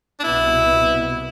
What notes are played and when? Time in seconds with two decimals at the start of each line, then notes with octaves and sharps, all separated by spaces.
0.19 D4
0.23 C2 B2 B3 E4